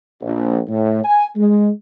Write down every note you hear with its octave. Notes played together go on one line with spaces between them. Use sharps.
A#1
A2
G#5
G#3